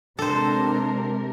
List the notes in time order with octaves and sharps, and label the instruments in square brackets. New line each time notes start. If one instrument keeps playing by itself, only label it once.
[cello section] C3 G#3 A#4 [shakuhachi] D4 [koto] A4 C5